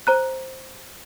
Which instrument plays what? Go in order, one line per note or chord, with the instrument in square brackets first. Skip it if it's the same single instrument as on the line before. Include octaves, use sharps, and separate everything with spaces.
[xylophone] C5 A#5 F#6